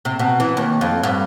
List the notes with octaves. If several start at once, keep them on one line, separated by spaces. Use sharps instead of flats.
C3
B2
E3
D#2
F2
G2